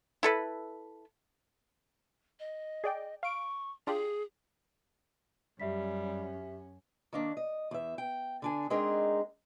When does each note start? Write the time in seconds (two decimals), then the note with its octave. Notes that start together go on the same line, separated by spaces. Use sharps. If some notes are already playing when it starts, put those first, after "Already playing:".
0.23 E4 A4 B4
2.40 D#5
2.84 G#4 D5 G5
3.23 F5 C#6 D7
3.87 D4 F4 G4 G#4
5.60 F#2 G3 C#4 G4 E5 B6
7.13 D#3 A#3 D4
7.37 D#5
7.71 E2 E5
7.98 G5
8.42 D3 D4 G#5
8.70 G#3 C4 D4 D#4 G#4 A#4